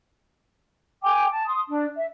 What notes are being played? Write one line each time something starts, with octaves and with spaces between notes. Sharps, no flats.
G5 G#5 D6
A5
C6 D#6
D4
E5